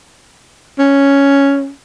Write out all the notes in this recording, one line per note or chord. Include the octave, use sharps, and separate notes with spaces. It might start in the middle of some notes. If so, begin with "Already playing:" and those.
C#4